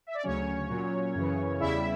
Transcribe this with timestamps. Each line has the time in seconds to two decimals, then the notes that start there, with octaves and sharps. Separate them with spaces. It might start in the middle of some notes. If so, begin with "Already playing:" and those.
0.07 E5
0.14 D5
0.23 D2 C#3 F#3 C#4 C#5
0.69 A#2 F#3
1.15 F#2 C#3 E3
1.60 E2 C#3 G3 E4 E5